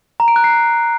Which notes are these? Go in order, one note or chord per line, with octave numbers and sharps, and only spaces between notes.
A#5
D7
F#6
C7